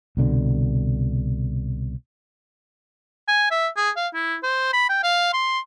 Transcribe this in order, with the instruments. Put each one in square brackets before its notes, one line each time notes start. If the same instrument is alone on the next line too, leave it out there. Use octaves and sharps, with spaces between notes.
[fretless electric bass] C2 B2 D3
[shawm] G#5
E5
G#4
F5
E4
C5
B5
G5
F5
C6